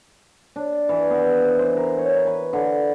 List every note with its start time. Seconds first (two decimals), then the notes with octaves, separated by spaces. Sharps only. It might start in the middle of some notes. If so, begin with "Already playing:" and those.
0.56 D4
0.89 E3
1.10 B3
1.43 C5
1.59 C5
1.76 A#4
1.98 C#5
2.27 B4
2.53 D3